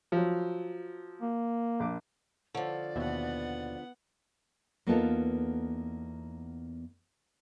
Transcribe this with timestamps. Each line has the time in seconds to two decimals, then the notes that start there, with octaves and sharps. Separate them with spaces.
0.12 F3 F#3
1.21 A#3
1.80 A#1 D6
2.55 D3 F3 A4 C#5 D5
2.96 D#2 B2 B3 E5 F#5
4.87 E2 A#3 B3 D#4 F4 A4